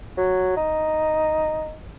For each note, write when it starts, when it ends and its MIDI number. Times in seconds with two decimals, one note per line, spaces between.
0.17 0.52 54
0.57 1.76 63